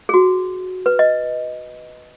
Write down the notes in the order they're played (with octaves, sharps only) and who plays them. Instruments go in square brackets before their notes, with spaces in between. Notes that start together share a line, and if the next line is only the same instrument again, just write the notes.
[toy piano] G#4
F#4
B4
D#5